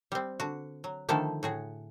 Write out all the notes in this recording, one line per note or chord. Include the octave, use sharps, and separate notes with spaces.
G3 C4
D3 F#4
F#3
D3 D#3 F3 A3 E4 A4
A2 F#4 G#4